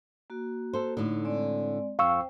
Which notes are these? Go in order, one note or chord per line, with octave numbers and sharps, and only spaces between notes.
A#3 F#4
A4 C5
A2 D3 D#4
G#3 C4 D5
F2 C5 F5 G5 C#6 E6